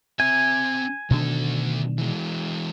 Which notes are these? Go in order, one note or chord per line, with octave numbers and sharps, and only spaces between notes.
C4 E5 G#5
D2 B2 D#3 D4 A4
E3 G#3